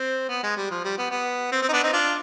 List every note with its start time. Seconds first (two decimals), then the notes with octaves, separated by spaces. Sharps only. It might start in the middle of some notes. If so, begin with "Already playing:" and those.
Already playing: C4
0.29 B3
0.43 G#3
0.57 G3
0.70 F3
0.84 G3
0.98 B3
1.11 B3
1.52 C4
1.62 C4
1.69 D#4
1.73 B3 D4
1.84 C4 D#4
1.93 D4 F4